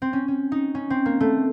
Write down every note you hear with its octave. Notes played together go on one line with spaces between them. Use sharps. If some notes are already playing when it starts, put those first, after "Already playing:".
C4
C#4
C#4
D#4
C#4
C4
A#3
A3